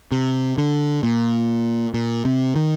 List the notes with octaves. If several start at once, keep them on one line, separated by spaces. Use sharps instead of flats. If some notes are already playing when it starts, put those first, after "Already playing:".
C3
D3
A#2
A#2
C3
D#3